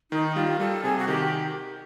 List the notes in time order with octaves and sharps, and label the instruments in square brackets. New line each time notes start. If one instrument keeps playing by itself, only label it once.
[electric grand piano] D#3 [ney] D#4
[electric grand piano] G3 [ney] F4
[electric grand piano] G3 [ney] A4
[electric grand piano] C3 [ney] G#4
[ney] F#4
[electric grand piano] D#3 [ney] G4